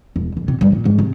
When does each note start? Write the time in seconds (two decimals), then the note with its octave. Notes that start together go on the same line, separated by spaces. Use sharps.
0.16 E1
0.37 D#1
0.48 C3
0.61 G2
0.72 A#2
0.85 G#2
0.98 C3